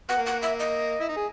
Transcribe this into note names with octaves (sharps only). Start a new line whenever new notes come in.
B3 F#5
A#3
F#5
E5
D#5
E4
D#4
G#4